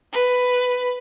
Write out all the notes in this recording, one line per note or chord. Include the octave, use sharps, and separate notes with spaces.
B4